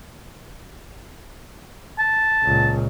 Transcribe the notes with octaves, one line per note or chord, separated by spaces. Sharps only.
A5
C#2 A#2